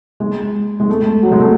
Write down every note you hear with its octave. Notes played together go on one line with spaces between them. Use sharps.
G#3
G#3
A3
F#3
G#3
A3